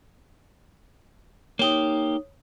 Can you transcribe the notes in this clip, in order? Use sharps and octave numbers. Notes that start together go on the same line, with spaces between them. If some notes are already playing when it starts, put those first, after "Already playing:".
A#3 D#4 G4 C#5 D#6